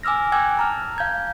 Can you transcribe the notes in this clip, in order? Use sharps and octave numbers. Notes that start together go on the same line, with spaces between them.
G#5 D6 E6 F6 A#6
G5 G#5 D6 E6 F#6 G#6
A5 A#5 F6
F5 G6 G#6